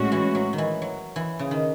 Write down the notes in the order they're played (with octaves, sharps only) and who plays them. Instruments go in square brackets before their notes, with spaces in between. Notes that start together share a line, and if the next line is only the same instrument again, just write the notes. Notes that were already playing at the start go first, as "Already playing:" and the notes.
Already playing: [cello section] A2 G#3 C#4 F#4
[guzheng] E3
F#3
D#3
E3
F#3
E3
C#3
D#3